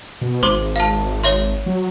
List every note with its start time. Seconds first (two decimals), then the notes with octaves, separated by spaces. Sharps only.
0.21 B2
0.43 G#1 C5 C6 D6
0.76 F5 A5
1.23 C#5 E5 C6
1.66 F#3